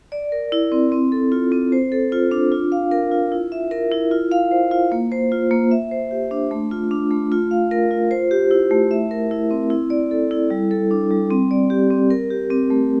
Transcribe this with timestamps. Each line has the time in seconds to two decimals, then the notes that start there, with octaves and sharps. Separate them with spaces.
0.12 D5
0.32 A#4
0.52 E4
0.72 C4
0.92 C4
1.12 A4
1.32 F4
1.52 C4
1.72 C5
1.92 A4
2.12 F4
2.31 D4
2.52 F4
2.72 F5
2.92 A#4
3.12 F4
3.32 E4
3.52 E5
3.71 A#4
3.92 E4
4.11 F4
4.32 F5
4.51 C5
4.71 F4
4.92 A#3
5.12 C5
5.32 F4
5.51 A#3
5.71 E5
5.91 C5
6.11 G4
6.31 D4
6.51 A3
6.71 F4
6.91 D4
7.11 A3
7.32 F4
7.51 F5
7.71 A#4
7.91 F4
8.11 C5
8.31 G4
8.51 E4
8.71 A3
8.91 E5
9.11 A#4
9.31 E4
9.51 C4
9.70 E4
9.90 D5
10.11 A4
10.31 E4
10.50 G3
10.71 A4
10.91 D4
11.11 G3
11.31 C4
11.51 D5
11.70 G4
11.90 C4
12.11 A#4
12.30 G4
12.51 C4
12.70 A3